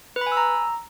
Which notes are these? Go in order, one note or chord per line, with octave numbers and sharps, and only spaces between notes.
B4
B5
G#5
E6
A#5